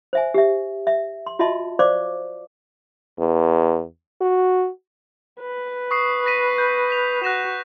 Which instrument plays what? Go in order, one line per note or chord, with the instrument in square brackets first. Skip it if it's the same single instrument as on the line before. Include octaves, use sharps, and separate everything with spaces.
[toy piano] C5 E5 G#5
G4 E5
E5
C6
F4 F#4 D#5 E5 A5 C6
C5 D5 F5 C#6 D6
[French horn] E2
F#4
[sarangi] B4
[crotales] C#6 D#6 C7
A#6 B6 D#7
G6
B6 F7
[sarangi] F#4 [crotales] F#6 A#6 E7